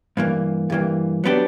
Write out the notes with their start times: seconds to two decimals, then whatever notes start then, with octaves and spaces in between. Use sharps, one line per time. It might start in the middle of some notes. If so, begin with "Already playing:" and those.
0.17 G2 E3 A#3
0.70 G2 E3 A#3
1.24 F#3 B3 D4 G4